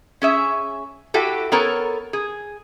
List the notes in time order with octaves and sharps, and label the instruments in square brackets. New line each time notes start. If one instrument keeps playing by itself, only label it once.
[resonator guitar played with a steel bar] C#4 G#4 E5
E4 F#4 G4 A4
B3 A4 A#4 C#5
G#4